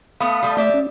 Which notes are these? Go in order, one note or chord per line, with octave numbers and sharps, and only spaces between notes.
A3 B3 F5 B5 D#6
G3 A3
A3 G4 D5 E5
C#4